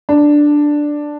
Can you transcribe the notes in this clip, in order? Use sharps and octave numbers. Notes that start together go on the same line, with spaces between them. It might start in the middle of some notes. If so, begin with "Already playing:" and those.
D4